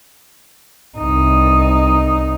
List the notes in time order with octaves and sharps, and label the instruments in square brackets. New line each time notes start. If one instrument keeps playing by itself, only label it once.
[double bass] C2 D#4